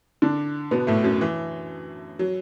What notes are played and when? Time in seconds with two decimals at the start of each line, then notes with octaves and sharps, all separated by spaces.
0.22 D3 D4
0.71 B2 B3
0.87 A2 A3
1.04 F#2 F#3
1.21 E3
2.19 F#3